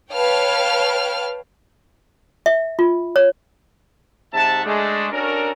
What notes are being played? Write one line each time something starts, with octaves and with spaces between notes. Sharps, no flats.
B4 C#5 F5 G5 A5 F6
E5
F4
C#5
G#2 C3 E5 F#5 A5
G#3 A3 D4
C#4 D4 F#4 A4 A#4